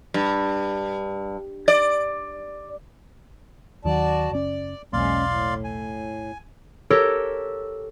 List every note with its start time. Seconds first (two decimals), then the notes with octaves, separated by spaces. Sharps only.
0.14 G2
1.68 D5
3.85 D#2 D#3 F#3 F#4 D5 A5
4.32 F#1 C#4 D5
4.93 E1 B1 G#3 A#3 C#4 D5 F5 C6
5.24 A2
5.64 G#5
6.90 G4 A4 A#4 C#5